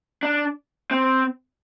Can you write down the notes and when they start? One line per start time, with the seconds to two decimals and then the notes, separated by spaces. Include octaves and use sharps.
0.23 D4
0.91 C4